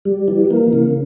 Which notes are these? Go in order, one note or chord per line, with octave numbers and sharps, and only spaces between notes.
G3
E3
A#3
C#3